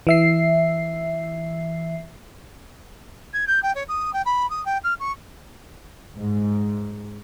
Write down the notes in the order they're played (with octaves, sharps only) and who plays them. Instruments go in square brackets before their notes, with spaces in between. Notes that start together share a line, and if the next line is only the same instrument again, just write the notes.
[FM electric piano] E3 E5 C7
[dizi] G#6
G6
G5
C#5
D#6
G5
B5
D#6
G5
F6
C#6
[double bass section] G#2